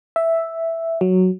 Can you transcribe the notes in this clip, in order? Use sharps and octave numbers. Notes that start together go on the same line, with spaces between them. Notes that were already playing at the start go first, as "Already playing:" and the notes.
E5
F#3